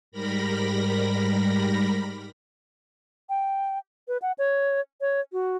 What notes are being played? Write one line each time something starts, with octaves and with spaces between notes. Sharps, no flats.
G#2 G3 A#4 B5 A#6
G5
B4
F#5
C#5
C#5
F#4